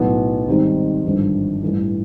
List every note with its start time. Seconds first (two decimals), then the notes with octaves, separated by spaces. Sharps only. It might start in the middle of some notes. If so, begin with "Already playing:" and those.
Already playing: B1 A2 F#3 B3
0.47 G#1 G#2 D#3 G3 C4
1.05 G#1 G2 D3 F3
1.62 A1 G2 E3